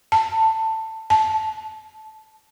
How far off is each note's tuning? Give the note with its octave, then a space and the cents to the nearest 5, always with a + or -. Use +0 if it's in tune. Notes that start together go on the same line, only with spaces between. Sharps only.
A5 +15
A5 -15